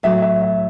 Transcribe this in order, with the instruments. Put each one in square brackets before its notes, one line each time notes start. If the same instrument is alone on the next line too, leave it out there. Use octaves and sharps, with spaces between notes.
[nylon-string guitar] A2 F#3 A3 [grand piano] E5
[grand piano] E5
E5